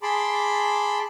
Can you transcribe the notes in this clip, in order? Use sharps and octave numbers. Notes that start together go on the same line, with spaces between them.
G#4 A5 B5 C6 D6